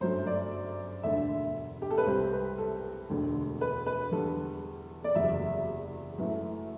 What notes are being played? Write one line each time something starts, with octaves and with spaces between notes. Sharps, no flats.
G1 F#2 F#3 A3 C5
D5
E1 D2 D3 E5
G4
A4
B4
C2 C3 G3 C5
B4
A4
E1 D2 D3
B4
B4
E2 D3 G3 A4
D5
F#1 E2 C3 F#3 E5
F#2 E3 A3